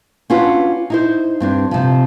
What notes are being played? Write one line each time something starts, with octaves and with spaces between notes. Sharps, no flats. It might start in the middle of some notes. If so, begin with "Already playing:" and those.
C#4 D4 F4 F#4 B4
D#4 E4 C5
G2 C4 D4
C3 F3